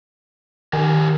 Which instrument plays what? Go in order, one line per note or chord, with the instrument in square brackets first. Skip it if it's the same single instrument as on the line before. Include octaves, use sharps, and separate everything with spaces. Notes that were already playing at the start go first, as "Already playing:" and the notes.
[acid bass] D#3 [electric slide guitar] G4 A#4 G#5